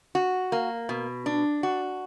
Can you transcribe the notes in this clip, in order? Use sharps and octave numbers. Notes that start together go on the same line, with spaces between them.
F#4
A#3
B2
D4
F#4